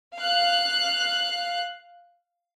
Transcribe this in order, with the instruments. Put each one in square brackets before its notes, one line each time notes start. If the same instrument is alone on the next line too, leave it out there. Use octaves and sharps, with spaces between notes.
[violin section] F5 F#6